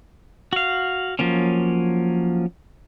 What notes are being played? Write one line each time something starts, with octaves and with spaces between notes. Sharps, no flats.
F#4 F5
F3 F#3 A#3 C#4